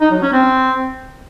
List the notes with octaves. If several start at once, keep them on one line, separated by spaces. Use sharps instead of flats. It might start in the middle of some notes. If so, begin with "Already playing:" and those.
D#4
F#3
C#4
C4